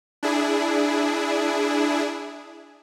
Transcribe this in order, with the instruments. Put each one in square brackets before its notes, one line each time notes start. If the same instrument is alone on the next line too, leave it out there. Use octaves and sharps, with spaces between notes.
[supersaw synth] D4 E4 G#4